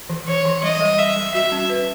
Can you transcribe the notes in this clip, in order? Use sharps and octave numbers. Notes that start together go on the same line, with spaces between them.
E3
E3 C#5
E3
G3 D#5
G3
G3 E5
G3
F#4 E5
C#4
B4